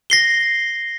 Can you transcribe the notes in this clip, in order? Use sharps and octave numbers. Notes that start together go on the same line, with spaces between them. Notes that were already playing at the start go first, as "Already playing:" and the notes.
A#6 C7 G7